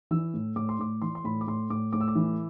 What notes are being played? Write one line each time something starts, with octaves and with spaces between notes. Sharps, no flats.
E3 E6
A2
A2 D6
C6
A2 D6
E3 C6
C6
A2 B5
D6
A2 C6
A2 D6
A2 D6
E6
D6
E3